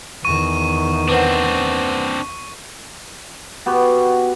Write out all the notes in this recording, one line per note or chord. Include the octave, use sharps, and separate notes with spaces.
E2 D#3 C#6 D#7
C4 D4 B4 C5 F#5
B3 F#4 G4